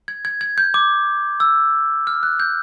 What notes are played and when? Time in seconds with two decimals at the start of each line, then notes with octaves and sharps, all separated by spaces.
0.08 G#6
0.25 G#6
0.41 G#6
0.58 G6
0.74 D6
1.40 E6
2.07 F6
2.23 F#6
2.40 G6